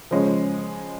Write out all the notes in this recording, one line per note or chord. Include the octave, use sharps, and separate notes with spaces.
C#3 F3 G#3 C#4